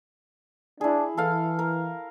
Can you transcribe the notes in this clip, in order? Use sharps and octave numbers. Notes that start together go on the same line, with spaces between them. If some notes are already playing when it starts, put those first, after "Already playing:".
D4 E4 G#4
E3 A4 F5
A#4